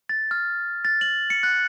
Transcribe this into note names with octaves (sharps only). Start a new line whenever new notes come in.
A6
F6
A6
F#7
C#7
F#6